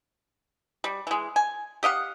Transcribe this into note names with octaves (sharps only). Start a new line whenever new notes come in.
G3
E3 G#3
G#5
G4 D#5 F5 F#5